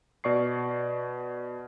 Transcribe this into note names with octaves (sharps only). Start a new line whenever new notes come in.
B2 D5 C#6 C7